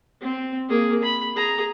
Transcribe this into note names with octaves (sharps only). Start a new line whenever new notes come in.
C4
A#3 G#4
B5
G#4 A#5